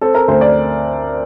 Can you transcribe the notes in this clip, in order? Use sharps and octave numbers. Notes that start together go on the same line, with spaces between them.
C4 A4
A#4
D2 C5
D5